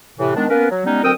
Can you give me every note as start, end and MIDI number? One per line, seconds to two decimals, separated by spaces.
0.18 0.33 45
0.18 0.33 48
0.18 0.33 52
0.35 0.46 51
0.35 0.46 56
0.35 0.46 59
0.35 0.46 62
0.49 0.69 58
0.49 0.69 59
0.49 0.69 61
0.49 0.69 70
0.49 0.69 71
0.70 0.83 54
0.85 0.99 55
0.85 0.99 56
0.85 0.99 59
0.85 0.99 61
0.85 0.99 63
1.03 1.12 38
1.03 1.12 54
1.03 1.12 60
1.03 1.12 70
1.03 1.12 79
1.03 1.12 87